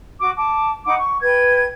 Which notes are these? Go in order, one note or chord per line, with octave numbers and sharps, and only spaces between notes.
F#4 D6
A5 D6
D#4 F#5 B5 D6
C#6
B4 G5 G#6